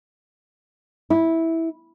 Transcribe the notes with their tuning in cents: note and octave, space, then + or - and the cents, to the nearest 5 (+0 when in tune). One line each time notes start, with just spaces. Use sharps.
E4 -10